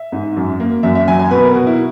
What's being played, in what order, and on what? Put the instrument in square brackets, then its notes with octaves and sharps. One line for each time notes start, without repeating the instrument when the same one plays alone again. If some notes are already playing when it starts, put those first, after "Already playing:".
Already playing: [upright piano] E5
G#2
F#2
A#3
F#2 E5
E5
F#3 G#5
G#5
B2 B4
A#4
B2 F#4
E4